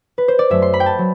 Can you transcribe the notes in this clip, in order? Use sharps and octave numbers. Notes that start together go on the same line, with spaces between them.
B4
C5
D5
F#2 F#3 A3 E5
C6
B5
G5
A5
F#3